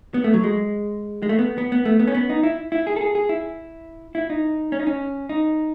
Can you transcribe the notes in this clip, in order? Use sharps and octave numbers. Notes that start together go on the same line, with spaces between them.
B3
A3
F#3
G#3
G#3
A3
B3
B3
B3
A3
B3
C#4
B3
D#4
E4
E4
G#4
A4
G#4
G#4
E4
E4
D#4
C#4
D#4
C#4
D#4